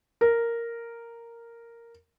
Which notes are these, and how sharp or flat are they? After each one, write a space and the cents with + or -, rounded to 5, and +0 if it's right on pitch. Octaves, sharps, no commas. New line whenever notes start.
A#4 -5